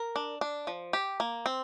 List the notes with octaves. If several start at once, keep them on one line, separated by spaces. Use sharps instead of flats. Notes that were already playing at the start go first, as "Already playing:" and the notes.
Already playing: A#4
D4
D4
F3
G4
A#3
C4